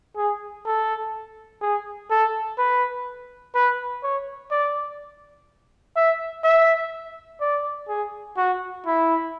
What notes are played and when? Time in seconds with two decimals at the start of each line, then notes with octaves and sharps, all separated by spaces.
0.17 G#4
0.66 A4
1.61 G#4
2.11 A4
2.58 B4
3.55 B4
4.03 C#5
4.51 D5
5.96 E5
6.44 E5
7.41 D5
7.89 G#4
8.37 F#4
8.86 E4